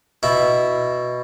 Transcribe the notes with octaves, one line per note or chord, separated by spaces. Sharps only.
B2 E4